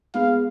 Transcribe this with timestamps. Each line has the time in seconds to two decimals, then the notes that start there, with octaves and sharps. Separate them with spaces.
0.14 G#3 B3 F5